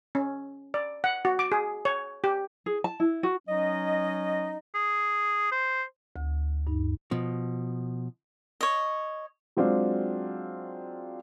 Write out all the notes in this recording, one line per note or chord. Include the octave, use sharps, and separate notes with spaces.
C#4
D5
F#5
F#4
D6
G#4
C#5
G4
G#4
A5
E4
F#4
F#3 C#4 D#4 D#5
G#4
C5
D2
G2 D#4
B2 F3
C#5 D#5
F#3 G#3 C4 D4 F4